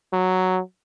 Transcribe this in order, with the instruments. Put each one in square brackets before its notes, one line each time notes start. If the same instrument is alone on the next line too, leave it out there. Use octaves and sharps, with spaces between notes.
[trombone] F#3